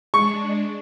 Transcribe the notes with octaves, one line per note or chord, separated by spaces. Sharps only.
G#3 D4 C#6